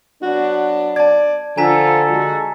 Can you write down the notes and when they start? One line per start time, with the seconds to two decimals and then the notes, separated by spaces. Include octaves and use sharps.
0.22 F#3 B3 D4 F#4
0.96 D5 A5 G#6
1.58 D3 F3 F4 A4 G#5 A#5 B6
2.09 G#3 F#4